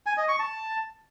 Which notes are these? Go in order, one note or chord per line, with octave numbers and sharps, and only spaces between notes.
G#5
D#5
C#6
A5